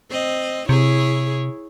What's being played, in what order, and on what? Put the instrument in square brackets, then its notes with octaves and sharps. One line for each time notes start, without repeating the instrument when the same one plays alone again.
[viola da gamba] C4 D#5
[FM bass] C3 [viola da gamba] E4 G#4 C#5